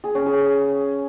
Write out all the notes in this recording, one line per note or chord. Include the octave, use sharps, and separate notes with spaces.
G#4
C#4
G#4